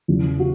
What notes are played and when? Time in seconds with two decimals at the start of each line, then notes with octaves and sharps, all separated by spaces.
0.08 E2 C#3 E3
0.39 F#4